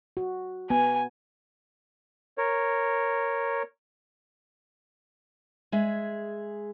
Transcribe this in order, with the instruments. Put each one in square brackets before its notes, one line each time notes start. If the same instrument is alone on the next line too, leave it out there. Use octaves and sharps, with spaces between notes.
[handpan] F#4
[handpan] B3 [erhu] G#5
[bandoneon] A#4 C#5
[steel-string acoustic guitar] G#3 G#4 E5